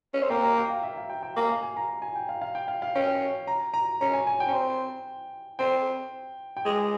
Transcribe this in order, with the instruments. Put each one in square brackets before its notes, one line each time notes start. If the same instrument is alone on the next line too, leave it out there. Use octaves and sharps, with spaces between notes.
[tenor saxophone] C#4
C4
[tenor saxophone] A#3 [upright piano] G5
[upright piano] A#5
G5
F5
E5
F5
G5
G5
[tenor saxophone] A#3 [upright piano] G#5
[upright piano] F5
G#5
A#5
G#5
G5
F5
F5
G5
F5
F5
[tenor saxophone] C#4 [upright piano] G5
[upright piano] A#5
A#5
[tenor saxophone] C#4 [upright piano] A#5
[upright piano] G#5
G#5
G5
[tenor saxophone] C#4
C4
[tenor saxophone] C4 [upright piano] G5
[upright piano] G5
[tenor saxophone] G#3 [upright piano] G#5